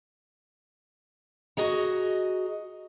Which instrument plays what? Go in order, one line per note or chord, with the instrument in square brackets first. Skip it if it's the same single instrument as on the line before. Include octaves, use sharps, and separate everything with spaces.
[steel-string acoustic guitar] F#4 G#4 D#5 A#5